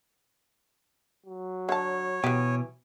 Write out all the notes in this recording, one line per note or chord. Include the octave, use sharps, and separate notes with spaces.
F#3
D3 C#5 A5
B2 E3 F#3 G4